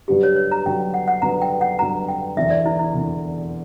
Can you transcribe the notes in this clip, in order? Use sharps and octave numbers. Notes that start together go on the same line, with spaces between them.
G2 D3 F#3 B3 G4
C#5
C#5
A#5
G2 D3 F#3 B3 G5
F#5
F#5
G2 D3 F#3 B3 A#5
G5
F#5
G2 D3 F#3 B3 A#5
G5
E1 E2 D3 E5
D5
E4
E4
E1 E2 D3